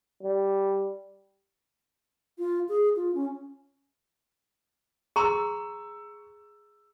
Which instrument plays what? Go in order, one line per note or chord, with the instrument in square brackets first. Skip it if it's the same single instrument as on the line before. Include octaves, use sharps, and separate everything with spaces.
[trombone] G3
[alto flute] F4
G#4
F4
C#4
[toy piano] G#4 A#5 C6 [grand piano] C#6 E6